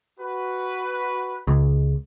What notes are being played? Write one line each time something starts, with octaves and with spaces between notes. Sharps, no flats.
F#4 B4
C#2